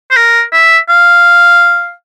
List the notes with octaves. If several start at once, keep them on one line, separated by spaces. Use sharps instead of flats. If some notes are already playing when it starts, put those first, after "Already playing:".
C5
A#4
E5
F5